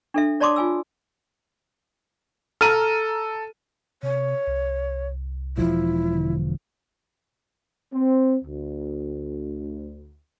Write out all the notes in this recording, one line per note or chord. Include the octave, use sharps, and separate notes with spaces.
D4 A4 E5
C#5 D5 A5 C6 D6 D#6
F4 G#5 E6
A4 A#5 F6 D#7
C3 C#5
C2
E1 F3 E4
D3
C4
D2